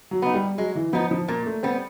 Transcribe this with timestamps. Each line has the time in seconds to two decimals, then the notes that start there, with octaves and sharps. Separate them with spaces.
0.11 F#3
0.22 B3 D#4
0.34 G3
0.58 F#3 G#3
0.75 E3
0.93 F3 B3 D#4
1.11 F3
1.28 A#2 A#3
1.46 A3
1.63 G3 B3 C4